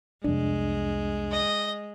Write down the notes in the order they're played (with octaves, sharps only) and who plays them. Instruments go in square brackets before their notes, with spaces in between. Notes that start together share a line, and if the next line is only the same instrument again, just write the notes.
[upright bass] C2 B3 [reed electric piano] F2 D4 [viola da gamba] G#3
[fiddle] D#5